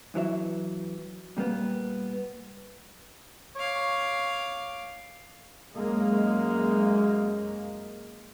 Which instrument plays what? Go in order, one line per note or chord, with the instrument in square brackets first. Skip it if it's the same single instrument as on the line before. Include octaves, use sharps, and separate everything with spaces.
[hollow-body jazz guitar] F#2 E3 F#3 E5
A#2 G3 A#3 B3
[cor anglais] C#5 [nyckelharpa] F5 D6
[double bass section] F#2 G#3 A#3